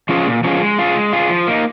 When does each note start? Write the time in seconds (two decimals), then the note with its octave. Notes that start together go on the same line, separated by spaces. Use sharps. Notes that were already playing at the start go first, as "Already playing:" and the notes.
0.09 F3 C#4 F4 G#4
0.27 A#2
0.43 F3 C#4 F4 G#4
0.61 G#3
0.79 F4 G#4
0.95 G#3
1.13 F4 G#4
1.30 F3
1.47 A#3 D#4